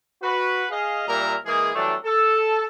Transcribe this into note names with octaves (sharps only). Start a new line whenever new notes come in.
F#4 B4
G#4 D#5 F5
A#2 G3 A#3 A#4 E5 A#5
E3 G#3 A#3 G#4
E3 F#3 G3 A3 D4
A4